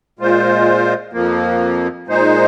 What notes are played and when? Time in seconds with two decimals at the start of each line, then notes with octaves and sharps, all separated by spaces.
0.19 A#2 G#3 F4 C5
1.13 F2 F3 A#3
2.07 A#2 G#3 D#4 C5